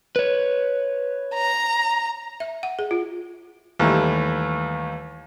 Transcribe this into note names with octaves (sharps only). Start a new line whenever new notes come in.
B4 C#5
A#5
E5
F#5
G#4
F4
D#2 E3 G3 A3